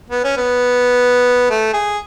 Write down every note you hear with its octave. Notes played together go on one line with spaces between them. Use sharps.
B3
C#4
B3
A3
G#4